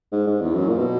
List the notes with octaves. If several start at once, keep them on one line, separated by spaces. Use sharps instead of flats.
G#2
G#2
E2
F#2
A#2
B2